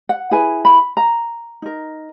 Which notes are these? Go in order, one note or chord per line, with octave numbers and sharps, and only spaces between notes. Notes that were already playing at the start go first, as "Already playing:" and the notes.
F#5
E4 G#4 B4 G#5
B5
A#5
D#4 A#4